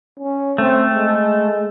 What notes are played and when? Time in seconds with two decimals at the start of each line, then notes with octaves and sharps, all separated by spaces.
0.20 C#4
0.58 A3 C4
0.95 G#3